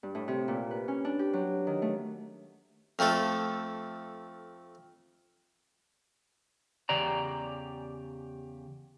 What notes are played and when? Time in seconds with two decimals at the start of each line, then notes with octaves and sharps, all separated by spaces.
0.03 G2
0.15 A2
0.28 C3
0.48 A#2
0.71 B4
0.88 C#4
1.05 D4
1.19 G4
1.33 F#3
1.67 D#3
1.82 A3
2.99 F2 F3 A3 A4
6.89 E2 C#3 G4 D5 A#5